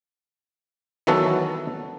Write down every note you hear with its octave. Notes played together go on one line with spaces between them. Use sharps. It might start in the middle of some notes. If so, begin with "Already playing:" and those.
D#3 E3 F#3 B3 F#4 A4